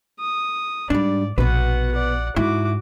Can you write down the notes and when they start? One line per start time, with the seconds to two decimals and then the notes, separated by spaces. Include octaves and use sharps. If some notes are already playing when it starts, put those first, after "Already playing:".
0.20 D#6
0.90 G#2 G3 D4 D5
1.38 A#1 B2 B3 F#4 B4 F#5
1.93 D5 F#5
2.36 G#2 E4 F#4 D6